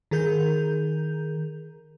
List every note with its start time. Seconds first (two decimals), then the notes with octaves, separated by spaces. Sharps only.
0.11 D#3 G#4 A#4 G6